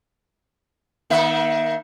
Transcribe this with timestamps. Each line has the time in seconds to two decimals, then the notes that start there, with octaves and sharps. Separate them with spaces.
1.10 D#3 A#3 E5